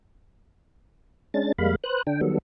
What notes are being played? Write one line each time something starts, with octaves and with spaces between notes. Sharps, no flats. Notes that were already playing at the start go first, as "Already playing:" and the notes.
G#3 C#4 D4 A6
F2 G3 G#3 A#3 F5 B5
B4 C5 F#6
D3 D4 G5
D#3 F#3 G3 B3 A4